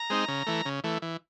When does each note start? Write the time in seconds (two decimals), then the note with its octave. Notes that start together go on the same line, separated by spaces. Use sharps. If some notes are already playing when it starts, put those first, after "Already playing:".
Already playing: A#5
0.10 G#3 C4 D#4
0.28 C#3
0.47 E3 A3
0.65 C#3
0.84 E3 A3
1.02 E3